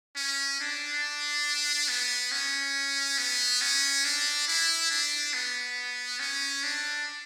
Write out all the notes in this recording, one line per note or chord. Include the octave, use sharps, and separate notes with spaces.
C#4
D4
B3
C#4
B3
C#4
D4
E4
D4
B3
C#4
D4